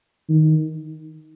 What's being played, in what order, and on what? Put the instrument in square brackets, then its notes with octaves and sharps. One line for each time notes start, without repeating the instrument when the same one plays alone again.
[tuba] D#3